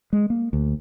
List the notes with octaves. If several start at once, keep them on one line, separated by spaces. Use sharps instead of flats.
G#3
A#3
D2